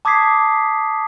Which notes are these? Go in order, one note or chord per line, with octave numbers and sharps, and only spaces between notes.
A5 D6 D#6 G#6 B6 C7